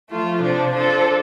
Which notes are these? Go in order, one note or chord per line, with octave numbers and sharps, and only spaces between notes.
F3 A3 F4
C3 F3 D4
F3 D4 A4